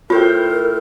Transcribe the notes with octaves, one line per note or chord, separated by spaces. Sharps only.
A2 F4 A#4 C5 G5